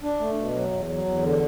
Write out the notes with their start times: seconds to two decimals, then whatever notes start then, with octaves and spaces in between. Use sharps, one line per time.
0.03 D4
0.20 A3
0.37 B2
0.53 F#3
0.71 E2
0.88 F#3
1.05 E2
1.22 D3